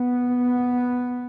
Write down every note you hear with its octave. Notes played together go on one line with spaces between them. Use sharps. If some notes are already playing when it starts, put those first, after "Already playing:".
Already playing: B3